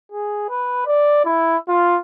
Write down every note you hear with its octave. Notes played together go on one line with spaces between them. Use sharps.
G#4
B4
D5
E4
F4